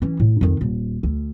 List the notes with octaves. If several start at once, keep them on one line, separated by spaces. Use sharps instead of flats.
E3 C#4
A2
F2 D#3
D#1
D2